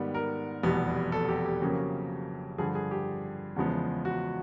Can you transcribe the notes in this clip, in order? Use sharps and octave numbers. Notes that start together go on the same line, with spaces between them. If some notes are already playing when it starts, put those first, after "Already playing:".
Already playing: G#2 D#3 G3 B3
A#4
F1 E2 B2 G3 B3
A4
G4
G4
F2 C#3 F#3 A#3 C#4
G2 D3 F3 G#4
G#4
G4
E2 C#3 F3 G#3 B3
F#4